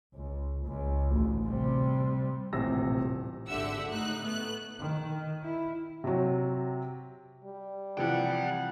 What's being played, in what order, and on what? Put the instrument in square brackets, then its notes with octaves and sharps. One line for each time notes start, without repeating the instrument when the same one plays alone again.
[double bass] C#2
C#2
A1 D2
C3 G3
[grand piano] D#1 A1 C3 E6 A#6
[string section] G#1 D3 G4 E5 F#5 E6
A2 D#4 F#6
A3 B3 F#6
[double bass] D#3
E4
[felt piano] C3 F#3
[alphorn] G3
[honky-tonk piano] C3 E3 F3 [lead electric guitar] D5 G5 [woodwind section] F#5